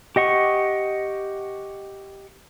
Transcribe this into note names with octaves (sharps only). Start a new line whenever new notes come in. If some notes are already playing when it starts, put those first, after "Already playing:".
G4 D#5 F#5 C#6